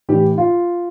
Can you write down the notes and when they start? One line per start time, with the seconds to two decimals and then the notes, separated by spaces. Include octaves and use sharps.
0.09 A2 E3 G4
0.38 F4